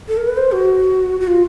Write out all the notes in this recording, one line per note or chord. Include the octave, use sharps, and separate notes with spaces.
A4
A#4
B4
C5
F#4
F#4
F4